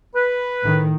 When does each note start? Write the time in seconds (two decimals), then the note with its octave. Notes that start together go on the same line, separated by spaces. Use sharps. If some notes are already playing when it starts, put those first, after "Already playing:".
0.14 B4
0.63 A2 D#3